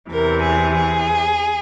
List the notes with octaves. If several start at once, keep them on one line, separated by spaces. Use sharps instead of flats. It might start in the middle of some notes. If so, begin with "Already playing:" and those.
E2 C3 E3 A#4
G#4
G#4